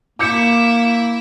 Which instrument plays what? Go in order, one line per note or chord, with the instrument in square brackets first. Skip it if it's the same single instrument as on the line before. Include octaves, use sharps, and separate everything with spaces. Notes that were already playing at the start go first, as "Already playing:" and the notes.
[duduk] A#3 [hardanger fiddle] E4 E5 [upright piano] D6 G6 C#7